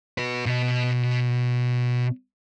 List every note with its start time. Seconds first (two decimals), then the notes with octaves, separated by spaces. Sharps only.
0.18 F#4 B4
0.46 B2 D#5